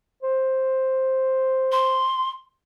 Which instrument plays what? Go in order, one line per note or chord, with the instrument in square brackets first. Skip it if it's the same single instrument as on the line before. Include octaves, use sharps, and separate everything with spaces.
[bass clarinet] C5
[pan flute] C6